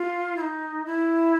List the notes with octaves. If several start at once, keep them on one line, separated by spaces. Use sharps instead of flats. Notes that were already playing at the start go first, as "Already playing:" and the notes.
Already playing: F4
E4
D#4
E4